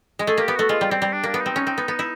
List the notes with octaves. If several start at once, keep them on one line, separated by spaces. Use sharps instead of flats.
G#3
A3 G#4
A#3 G4
B3
A3 F#4
G#3 F4
G3
G3 C4
G3
D4
A#3 D4
B3
C4 D#4
C#4
C4
B3
B3
E4